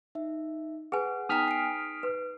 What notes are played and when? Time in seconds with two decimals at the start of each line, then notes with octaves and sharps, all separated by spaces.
0.15 D#4 E5
0.92 G#4 B4 F#5 G#5
1.29 B3 D#4 G5 G#5 A#5 D#6 F6 B6
1.48 C7 D7
2.03 B4